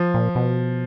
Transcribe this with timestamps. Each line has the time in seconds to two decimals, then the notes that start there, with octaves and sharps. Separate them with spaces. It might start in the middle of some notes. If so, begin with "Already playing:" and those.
Already playing: F3
0.14 A#2
0.35 B2